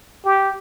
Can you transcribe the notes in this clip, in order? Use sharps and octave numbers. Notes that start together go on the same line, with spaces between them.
G4